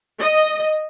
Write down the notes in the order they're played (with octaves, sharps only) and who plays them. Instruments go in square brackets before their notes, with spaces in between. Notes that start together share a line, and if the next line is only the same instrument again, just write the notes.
[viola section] D#5